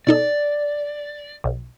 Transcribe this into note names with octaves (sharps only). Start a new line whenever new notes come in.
B2 D#4 A4 D5
B1